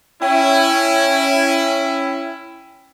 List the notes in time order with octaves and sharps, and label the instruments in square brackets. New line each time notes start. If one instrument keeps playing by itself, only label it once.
[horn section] C#4 E4 [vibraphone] G5